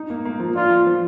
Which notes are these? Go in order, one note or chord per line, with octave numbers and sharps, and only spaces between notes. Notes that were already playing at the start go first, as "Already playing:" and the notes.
Already playing: D#4
A#3
A#3
F3
D4 F4
F3
F3